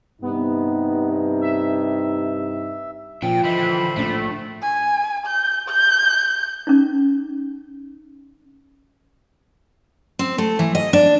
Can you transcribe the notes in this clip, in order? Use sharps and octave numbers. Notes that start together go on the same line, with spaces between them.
G2 C3 B3 D#4
E5
A#2 F3 E5 G5
D3 E3 C5 D#5 E5 B5
A#1 A2 A3 D4
G#5
G6
G6
C#4 D#4
C4
A3
E3
D#5
D4